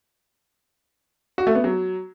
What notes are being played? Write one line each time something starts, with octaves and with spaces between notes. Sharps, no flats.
F#4
A3
B3
F#3